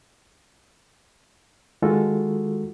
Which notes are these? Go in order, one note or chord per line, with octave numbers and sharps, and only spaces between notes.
D#3 G#3 F4 F#4 A4